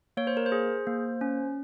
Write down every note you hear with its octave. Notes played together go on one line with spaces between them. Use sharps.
A#3 C#5
C5
A#4
C5
G#4
A#3
C#4